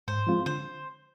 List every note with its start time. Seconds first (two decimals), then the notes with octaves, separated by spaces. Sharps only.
0.08 G#2 C5
0.27 F3 G#3 C4 F4
0.46 D3 C5